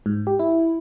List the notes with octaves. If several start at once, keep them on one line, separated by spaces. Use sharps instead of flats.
G#2
G4
E4